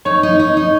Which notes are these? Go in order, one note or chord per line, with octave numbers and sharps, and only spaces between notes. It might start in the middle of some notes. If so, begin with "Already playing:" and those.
D#4 C#5
D#4
D#4
D#4